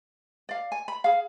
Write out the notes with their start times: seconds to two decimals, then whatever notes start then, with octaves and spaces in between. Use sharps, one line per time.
0.49 D5 F5
0.72 G#5
0.88 B5
1.04 G#4 F5